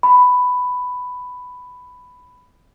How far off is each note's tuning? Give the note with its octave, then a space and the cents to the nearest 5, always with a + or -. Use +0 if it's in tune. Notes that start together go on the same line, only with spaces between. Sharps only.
B5 +10